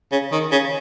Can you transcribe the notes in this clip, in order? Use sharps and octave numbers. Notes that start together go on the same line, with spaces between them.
C#3
D#3
C#3